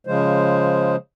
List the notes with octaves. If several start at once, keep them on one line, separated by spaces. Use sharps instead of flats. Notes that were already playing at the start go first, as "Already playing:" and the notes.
C#3 F3 G#3 C5